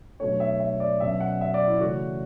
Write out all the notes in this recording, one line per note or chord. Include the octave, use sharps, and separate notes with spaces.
B2 F#3 A3 D4 C#5
E5
E5
D5
B2 F#3 C#4 E5
F#5
E5
D5
E4
C#3 E3 A3 C#4 F#4